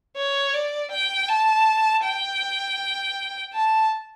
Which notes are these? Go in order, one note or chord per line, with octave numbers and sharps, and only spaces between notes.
C#5
D5
G5
A5
G5
A5